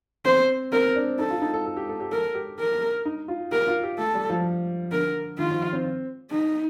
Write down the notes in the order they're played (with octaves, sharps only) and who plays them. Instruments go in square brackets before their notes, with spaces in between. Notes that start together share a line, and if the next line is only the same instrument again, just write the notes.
[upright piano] C4 [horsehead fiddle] C5
[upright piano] C4 [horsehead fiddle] A#4
[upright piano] D4
[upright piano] D#4 [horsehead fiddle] A4
[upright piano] F4
D#4
A4
A4
G4
A4
G4
[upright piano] A4 [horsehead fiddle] A#4
[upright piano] G4
[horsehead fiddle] A#4
[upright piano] D#4
F4
[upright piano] G4 [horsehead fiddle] A#4
[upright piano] F4
G4
[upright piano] A3 [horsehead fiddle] A4
[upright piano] G3
F3
[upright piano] D3 [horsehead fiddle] A#4
[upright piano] D#3 [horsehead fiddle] F4
[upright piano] F3
C4
[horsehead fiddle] D#4